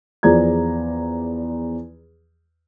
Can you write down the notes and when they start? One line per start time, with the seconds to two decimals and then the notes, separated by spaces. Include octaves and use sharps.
0.23 E2 F3 G#4 D5 A#5 G#6